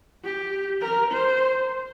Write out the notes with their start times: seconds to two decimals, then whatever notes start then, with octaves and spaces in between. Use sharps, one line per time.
0.24 G4
0.82 A#4
1.12 C5